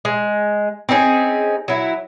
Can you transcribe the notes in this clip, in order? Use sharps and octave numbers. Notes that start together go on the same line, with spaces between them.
G#3
C4 C#4 D#4 G#4
F#3 E4